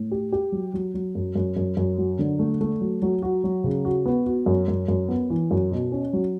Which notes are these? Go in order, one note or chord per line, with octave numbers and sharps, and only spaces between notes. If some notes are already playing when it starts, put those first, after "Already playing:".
Already playing: A2
G4
G4
F#3
F#3
F#3
F#2
F#2
F#2
F#2
F#3
D3
A3
A3
F#3
F#3
F#4
F#3
C#3
F#4
B3
F#4
F#2
F#2
F#2
B3
E3
F#2
B2
C#4
F#3